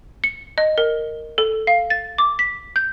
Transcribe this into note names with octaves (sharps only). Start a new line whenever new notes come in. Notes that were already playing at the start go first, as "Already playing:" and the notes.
C#7
D#5
A#4
A4
F5
A6
D6
B6
G6